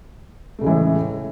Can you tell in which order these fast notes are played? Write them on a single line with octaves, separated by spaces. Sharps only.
A3 C#3 G#3 E3 A2